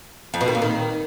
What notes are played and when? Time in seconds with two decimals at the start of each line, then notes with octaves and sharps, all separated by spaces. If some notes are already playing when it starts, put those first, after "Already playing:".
0.34 F2
0.41 B2
0.48 D#3
0.55 A#2
0.62 D#3